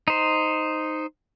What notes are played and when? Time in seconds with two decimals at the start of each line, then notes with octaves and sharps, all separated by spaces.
0.08 D#4 C5